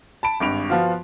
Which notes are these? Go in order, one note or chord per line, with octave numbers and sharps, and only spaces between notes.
A5 B5 D7
G#1 G2 D7 F7
F3 B3 F4 F#4